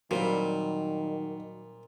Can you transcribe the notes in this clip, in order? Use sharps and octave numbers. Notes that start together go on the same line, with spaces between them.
A#2 D#3 F#3 G3 A#3 C4